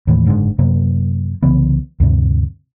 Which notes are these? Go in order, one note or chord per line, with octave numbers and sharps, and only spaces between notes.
D#2 A2 E3
F#1 G#2 D3 G#3
F#2 C3 F#3 A#3
C2 C#3 E3 B3
D2 G2 C3